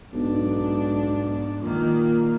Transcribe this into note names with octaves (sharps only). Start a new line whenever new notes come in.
B1 G#2 D4
A#2 D#3 A#3